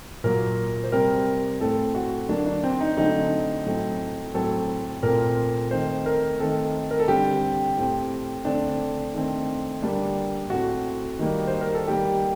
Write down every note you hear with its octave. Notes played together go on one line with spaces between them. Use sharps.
A#2 F#3 A#3 A#4
C5
C3 G3 C4 A#4
A2 A3 C4 A4
F#4
D3 F#3 A#3 D4
D4
C4
D#4
D3 F#3 A3 C4 D#4
A2 F#3 A3 C4
A2 F#3 C4 A4
A#2 A3 C4 A#4
D#3 A3 C4 C5
A#4
D#3 A3 C4 A4
A#4
A4
D3 G3 C4 G4
A2 A3 C4
D3 A3 C4 D4
D#3 A3 C4
D3 G3 A#3 D4
A2 A3 C4 F#4
D#3 G3 A#3
C5
A#4
A4
D#3 G3 A#3 G4